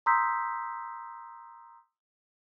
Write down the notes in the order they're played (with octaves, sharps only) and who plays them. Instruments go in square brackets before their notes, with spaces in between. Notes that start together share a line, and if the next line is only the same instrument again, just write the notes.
[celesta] A#5 C6 D#6 E6 G6 B6